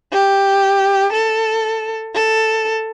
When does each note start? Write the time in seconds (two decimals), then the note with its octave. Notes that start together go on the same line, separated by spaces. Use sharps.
0.13 G4
1.12 A4
2.14 A4